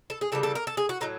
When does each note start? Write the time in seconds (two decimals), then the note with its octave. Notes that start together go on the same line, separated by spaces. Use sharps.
0.10 A4
0.21 G#4
0.32 C#3 E3 G3 A4
0.43 A4
0.55 A#4
0.67 A4
0.77 G#4
0.89 F#4
1.01 A2 F#3 D#4